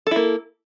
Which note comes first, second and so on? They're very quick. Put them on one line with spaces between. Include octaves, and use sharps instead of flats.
A4 E4 A#3